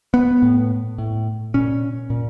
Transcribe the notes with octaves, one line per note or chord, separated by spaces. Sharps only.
B3
A2
A2
A#2 C#4
A#2